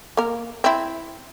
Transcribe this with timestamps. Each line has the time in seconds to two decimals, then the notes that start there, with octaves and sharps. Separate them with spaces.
0.17 A#3 A#4
0.64 C4 E4